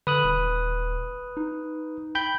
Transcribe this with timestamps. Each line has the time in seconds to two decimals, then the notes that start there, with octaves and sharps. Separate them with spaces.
0.07 D3 B4 D#6 F#6
0.24 D#1
1.37 D#4
2.15 G5 B5 G6